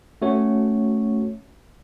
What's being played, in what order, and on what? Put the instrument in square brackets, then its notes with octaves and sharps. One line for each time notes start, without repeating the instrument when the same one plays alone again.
[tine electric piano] A3 C#4 F#4 C#5